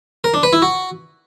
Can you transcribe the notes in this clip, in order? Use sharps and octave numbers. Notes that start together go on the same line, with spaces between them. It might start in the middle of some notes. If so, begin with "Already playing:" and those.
A#4
D4
B4
E4
F#4